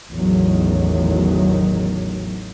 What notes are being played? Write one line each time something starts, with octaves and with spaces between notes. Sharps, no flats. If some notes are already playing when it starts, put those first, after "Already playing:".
A1 E2 A2 D#3 F#3